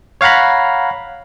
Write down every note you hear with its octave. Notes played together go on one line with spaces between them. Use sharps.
C#5 F5 F#5 A#5 B5